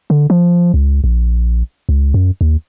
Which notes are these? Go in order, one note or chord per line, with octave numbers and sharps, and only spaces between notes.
D3
F3
C#2
A#1
C#2
F#2
D#2